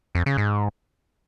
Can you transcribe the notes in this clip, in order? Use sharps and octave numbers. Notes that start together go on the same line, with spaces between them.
F2
C#3
G#2